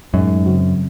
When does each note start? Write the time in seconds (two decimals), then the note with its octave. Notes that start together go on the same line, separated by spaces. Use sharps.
0.13 F#2 A2 G#3 D#4
0.46 C#3 F#3 C4 F#4